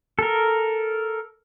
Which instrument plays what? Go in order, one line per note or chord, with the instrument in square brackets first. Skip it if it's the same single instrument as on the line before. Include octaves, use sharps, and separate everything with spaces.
[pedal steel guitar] A4 A#4